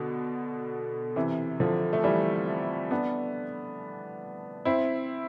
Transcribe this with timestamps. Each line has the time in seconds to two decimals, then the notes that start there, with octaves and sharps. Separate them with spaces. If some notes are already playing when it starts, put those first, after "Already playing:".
Already playing: B2 D3
1.16 C3 E3
1.60 D3 F3
1.93 A3
2.03 E3 G3
2.91 B3 D4
4.65 C4 E4